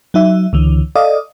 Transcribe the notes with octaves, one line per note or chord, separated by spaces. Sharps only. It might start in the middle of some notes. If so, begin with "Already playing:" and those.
F#3 D#4 E5
C#2 D3 E3
A4 D5 D#5 F5 D#6